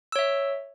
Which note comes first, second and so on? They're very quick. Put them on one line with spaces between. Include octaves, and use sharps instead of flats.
E6 C#5 E5